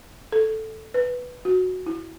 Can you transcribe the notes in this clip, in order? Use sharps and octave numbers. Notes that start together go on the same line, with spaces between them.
A4
B4
F#4
E4